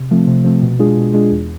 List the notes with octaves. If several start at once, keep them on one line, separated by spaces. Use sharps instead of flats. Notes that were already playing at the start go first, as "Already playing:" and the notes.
Already playing: C3
F3 A3 C4
C3
F3 A3 C4
B2
G#3 D4 F4 G#4
B2
G#3 D4 F4 G#4
E2